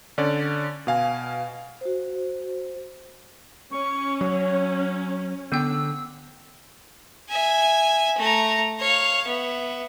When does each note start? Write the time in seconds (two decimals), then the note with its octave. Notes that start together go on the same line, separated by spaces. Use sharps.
0.18 D3 C#4 D5
0.87 B2 F5 G#5
1.81 F#4 C5
3.71 C#4 C#6
4.21 F#3 C#5
5.52 D3 B3 G5 E6
7.29 E5 G#5
8.18 A3 A#5
8.79 C#5 F5
9.27 B3 E5